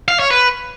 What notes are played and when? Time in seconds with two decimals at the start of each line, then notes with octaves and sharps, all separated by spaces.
0.08 F5
0.19 C#5
0.31 B4